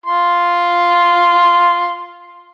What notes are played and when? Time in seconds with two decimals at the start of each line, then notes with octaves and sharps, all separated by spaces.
0.06 F4 C6